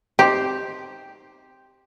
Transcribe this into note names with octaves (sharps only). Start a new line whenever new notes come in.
C4 D#4 G4